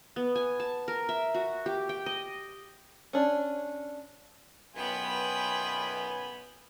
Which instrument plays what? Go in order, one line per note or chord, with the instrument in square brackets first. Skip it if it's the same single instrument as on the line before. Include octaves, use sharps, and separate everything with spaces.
[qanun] B3
G#5
A5
A#4
E5
F#4
G4
G5
D#5
[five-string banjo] C#4 D4
[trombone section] B1 F#2 B4 [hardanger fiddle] B3 B5 [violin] F4 G5 [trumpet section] G#5